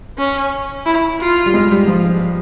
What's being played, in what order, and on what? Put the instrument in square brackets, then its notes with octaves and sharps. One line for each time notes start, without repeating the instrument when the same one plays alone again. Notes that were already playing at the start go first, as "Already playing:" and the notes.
[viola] C#4
E4
F4
[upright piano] G3
G#3
G3
F3